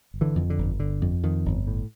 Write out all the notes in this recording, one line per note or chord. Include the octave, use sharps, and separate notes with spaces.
G1
D3 E3
F2
D3
G1
G1 D3
F2
F2 D#3
G1
A2